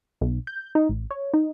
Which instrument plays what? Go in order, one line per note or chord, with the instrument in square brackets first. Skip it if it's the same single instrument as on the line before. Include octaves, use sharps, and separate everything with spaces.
[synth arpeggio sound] B1
G6
D#4
A1
C#5
D#4